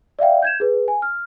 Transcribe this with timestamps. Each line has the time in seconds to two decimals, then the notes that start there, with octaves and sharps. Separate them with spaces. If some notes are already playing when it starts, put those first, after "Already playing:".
0.19 D5 E5 F5 G5
0.42 G6 G#6 E7
0.60 G#4 B4
0.88 G#5
1.02 F6